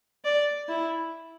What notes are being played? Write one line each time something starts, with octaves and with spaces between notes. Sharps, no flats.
D5
E4